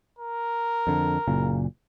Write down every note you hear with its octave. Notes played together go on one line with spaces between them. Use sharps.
A#4
F2 D3
F#1 A#2 C#3